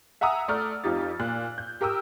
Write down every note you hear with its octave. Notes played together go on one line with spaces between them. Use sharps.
E5 F#5 G#5 A#5 D#6 E6
A3 D5 A#5 F6
F2 F3 D#4 G4 A6
A#2 F#6
G6
G4 A#4 G5 D#6 E6